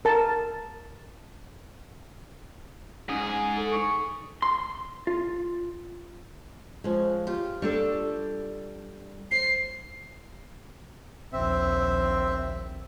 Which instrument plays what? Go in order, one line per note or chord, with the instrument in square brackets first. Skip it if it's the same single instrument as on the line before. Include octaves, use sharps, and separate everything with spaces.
[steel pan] A#4 A5
[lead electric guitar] G#2 G#4 [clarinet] C#4
[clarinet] A4
C#6
[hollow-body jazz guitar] C6
F4
[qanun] F3 C#4 [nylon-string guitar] G#3
[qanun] F4 G4
[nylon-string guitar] G3 D4 A4 [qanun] C#6
[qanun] C5 C#5 [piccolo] C7
[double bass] A#1 D#2 [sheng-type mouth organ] C4 E5